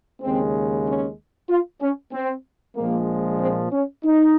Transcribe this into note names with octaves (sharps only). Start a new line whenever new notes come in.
D#2 C#3 G#3 C4
C#4
F4
C#4
C4
A#1 A#2 F3 G#3 A#3
C4
C#4
D#4